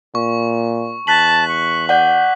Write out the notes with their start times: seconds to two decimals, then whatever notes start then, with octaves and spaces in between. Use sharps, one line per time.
0.15 A#2 C#6
1.07 E2 A5 F#6 B6 F#7
1.49 C#6
1.89 D5 F#5 G6